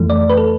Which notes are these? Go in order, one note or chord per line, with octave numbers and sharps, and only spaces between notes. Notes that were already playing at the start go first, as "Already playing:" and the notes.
Already playing: F2 E3 A3
D5
B4
A4